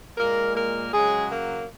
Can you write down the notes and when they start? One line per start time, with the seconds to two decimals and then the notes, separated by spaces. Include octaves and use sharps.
0.17 A#2 G#3 A#3 A#4
0.55 A#3 A#4
0.93 C#3 F#3 G#3 G#4
1.31 A#3